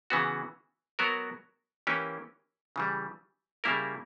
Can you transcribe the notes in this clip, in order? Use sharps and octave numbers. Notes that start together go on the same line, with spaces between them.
C#3 E3 B3 F#4
F#3 B3 F#4 A#4
E3 A#3 C#4 G4
C#3 E3 G3
C#3 G3 A#3 E4 A#4